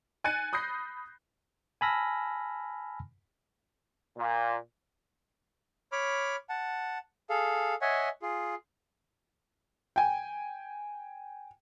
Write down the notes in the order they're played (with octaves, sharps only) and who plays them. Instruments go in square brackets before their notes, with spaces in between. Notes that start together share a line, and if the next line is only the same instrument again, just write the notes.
[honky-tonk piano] G#5 F#6 A6 C#7 D#7
B5 D#6 G6 A#6 C7
[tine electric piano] G#5 A5 B5 E6 F6 A#6
[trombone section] A#2
[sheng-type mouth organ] C#5 B5 D6 F6
F#5 A5
G#4 A4 F5
C#5 D#5 E5 F#5 G#5
F4 G#4
[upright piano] G5 G#5